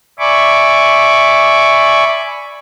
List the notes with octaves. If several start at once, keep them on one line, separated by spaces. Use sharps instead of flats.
D5 E5 G#5 B5 C#6 D6